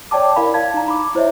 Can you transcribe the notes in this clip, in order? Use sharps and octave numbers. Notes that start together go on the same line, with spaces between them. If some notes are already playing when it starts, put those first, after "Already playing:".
C#5 D5 G5 A5 D6
E4 A#4 D5 F5 B5
F5 A5 G#6
D#4 A#5
B5 D6
E4 C5 C#5 D#5 E5